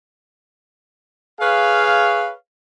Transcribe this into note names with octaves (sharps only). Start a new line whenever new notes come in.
G#4 B4 C#5 F5